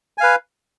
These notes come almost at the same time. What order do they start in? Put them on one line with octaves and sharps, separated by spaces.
G#5 F5 B4